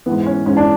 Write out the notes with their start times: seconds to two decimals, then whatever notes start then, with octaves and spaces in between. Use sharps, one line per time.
0.06 G#2 E3 B3
0.26 C#4
0.46 G#2 E3 C#4
0.57 D4